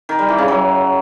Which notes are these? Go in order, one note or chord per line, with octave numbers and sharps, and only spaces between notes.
D#3
G3
E3
C#3
F#3